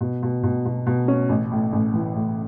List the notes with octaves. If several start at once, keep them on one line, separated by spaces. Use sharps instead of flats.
B2
B2
B2
B2
B2
C#4
A1
A2
A1
E3
A2